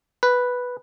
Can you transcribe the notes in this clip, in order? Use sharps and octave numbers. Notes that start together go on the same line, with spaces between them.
B4